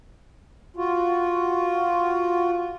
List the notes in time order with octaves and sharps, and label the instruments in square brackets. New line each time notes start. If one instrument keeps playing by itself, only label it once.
[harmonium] F4 F#4